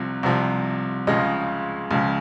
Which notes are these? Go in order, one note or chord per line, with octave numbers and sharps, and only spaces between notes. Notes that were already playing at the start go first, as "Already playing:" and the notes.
Already playing: C2 C3 F3
C2 C3 F3
C#2 C#3 F3 D#5
C#2 C#3 F3